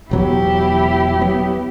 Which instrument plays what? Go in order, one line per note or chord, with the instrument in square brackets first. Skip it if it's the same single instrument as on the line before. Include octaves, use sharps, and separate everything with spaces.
[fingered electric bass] E1 F#3 B3 [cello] E4 G4
[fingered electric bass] F#3 B3